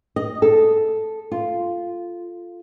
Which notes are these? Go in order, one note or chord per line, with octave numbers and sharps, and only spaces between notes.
D#5
A4
F4